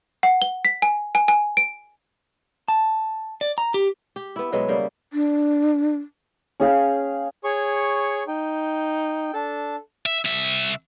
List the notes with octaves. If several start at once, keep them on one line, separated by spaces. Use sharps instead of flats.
F#5
G7
B6
G#5
G#5
G#5
D7
A5
D5
A#5
G4
G4
B3 E4
B2 F#3 G#3 B3
C#3 G3 A#3
D4
C#4 G#4 F5 G5
G#4 C#5 C#6
D#4 G5
D4 A4 A5
E5
C2 E5